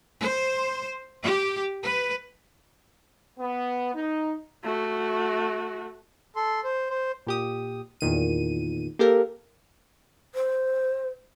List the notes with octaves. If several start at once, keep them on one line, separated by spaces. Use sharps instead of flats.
C5
G4
B4
B3
D#4
A3 F#4
A4 C6
C5
C5
A#2 G4 D#6
E2 A#2 D#3 D#7
A#3 G4 A4 A#4
C5